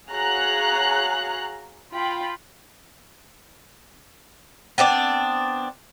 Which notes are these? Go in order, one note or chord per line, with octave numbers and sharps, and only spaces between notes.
F#4 G#4 C#5 F5 A#5 F#6
F4 G5 B5
B3 C4 D4 D5